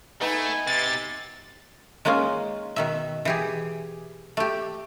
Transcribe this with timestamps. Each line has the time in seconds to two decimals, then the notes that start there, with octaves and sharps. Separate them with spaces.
0.21 A3 B3 D#4 G#5
0.67 C3 A6
2.05 G#3 A#3 C#4 D#4 F4
2.76 B2 D#3 E5
3.25 E3 G4 G#4
4.37 A3 G4